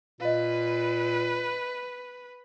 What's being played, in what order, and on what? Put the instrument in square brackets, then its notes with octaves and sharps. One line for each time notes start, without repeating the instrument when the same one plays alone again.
[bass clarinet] A#2 [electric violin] B4 [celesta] D#5 F5